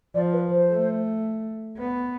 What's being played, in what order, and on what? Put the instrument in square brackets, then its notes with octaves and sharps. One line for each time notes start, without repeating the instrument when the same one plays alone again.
[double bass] F3 [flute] D5
[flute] B4
C5
[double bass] A3
B3